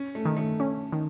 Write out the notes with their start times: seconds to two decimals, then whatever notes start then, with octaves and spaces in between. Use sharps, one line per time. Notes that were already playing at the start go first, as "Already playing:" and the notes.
Already playing: C#4
0.15 A3
0.25 D#3
0.37 A3
0.60 C#4
0.93 D#3